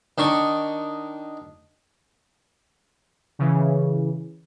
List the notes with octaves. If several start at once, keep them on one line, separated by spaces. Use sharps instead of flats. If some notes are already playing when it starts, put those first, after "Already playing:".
D#3 D4 C#6
C#3 E3